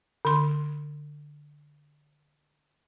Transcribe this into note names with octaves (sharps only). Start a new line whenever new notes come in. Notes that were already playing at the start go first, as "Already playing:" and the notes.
D3 C6